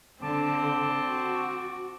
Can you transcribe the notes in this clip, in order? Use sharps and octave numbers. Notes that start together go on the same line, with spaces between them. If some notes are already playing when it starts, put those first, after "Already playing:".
D3 C4 A5 D6
F#4